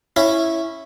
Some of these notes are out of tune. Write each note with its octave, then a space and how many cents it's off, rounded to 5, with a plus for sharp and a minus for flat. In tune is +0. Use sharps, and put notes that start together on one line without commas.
C#4 -10 E4 +0